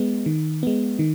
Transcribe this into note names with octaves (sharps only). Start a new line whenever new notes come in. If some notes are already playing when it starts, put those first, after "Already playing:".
Already playing: G#3 B3
D#3
G#3 B3
D#3